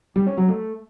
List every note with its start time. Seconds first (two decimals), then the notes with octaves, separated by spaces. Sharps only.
0.16 G3
0.27 C#4
0.37 F#3
0.48 A3